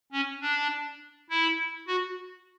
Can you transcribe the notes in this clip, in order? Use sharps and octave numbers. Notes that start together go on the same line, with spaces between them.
C#4
D4
E4
F#4